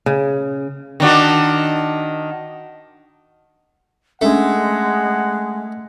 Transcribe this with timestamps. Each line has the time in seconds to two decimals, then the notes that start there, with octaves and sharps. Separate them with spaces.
0.06 C#3
1.00 D#3 D4 F#4
4.22 G#3 A3 C#4 D4 F#5